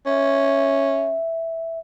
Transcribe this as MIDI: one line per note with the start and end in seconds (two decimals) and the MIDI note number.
0.06 1.17 61
0.06 1.78 76